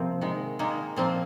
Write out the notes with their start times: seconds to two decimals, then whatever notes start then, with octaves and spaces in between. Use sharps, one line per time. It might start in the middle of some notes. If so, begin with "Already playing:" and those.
Already playing: C3 F3 A#3 C4
0.21 D#3 G#3
0.59 D#3 G#3 A#3
0.96 A#2 F3 A#3 C4